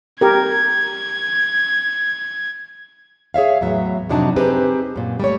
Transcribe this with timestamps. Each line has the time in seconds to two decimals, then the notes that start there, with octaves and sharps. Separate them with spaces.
0.21 G4 A#4 G#6
3.34 G#4 C#5 E5 F5
3.61 E2 A2 F#3 E5
4.09 F2 C3 F#3 D4 D#4 A5
4.36 C4 D#4 G4 G#4 B4 C5
4.96 F#2 A#2
5.20 G3 A3 C#5